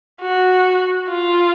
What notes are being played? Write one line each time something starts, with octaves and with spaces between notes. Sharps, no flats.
F#4
F4